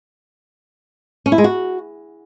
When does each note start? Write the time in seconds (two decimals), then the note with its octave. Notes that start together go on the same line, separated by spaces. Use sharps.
1.26 C#4
1.32 E4
1.38 G#3
1.44 F#4